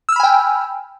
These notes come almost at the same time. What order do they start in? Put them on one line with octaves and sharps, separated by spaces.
E6 F6 B5 G#5 G5